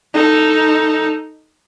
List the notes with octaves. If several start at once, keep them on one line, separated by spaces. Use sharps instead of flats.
D#4 A4